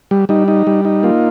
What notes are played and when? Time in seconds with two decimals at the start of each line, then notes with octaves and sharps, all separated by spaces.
0.11 G3
0.29 G3 D#4
0.48 D#4
0.67 G3
0.85 D#4
1.03 A#3 F4